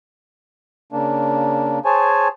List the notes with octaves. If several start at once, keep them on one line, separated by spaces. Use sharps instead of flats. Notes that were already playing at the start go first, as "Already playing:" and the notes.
C#3 A#3 D4
G#4 C5 C#5 G#5 A5